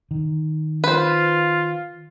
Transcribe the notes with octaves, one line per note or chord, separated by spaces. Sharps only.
D#3
F4 B4 C5